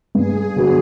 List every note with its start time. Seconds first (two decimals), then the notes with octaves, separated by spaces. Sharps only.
0.14 G2 G#4
0.56 D3 F#3 B3